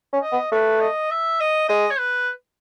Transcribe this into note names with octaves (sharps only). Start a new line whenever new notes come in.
C#4
D#5
B3
A3 B4
D#5
E5
D#5
G#3 D#5
C#5
B4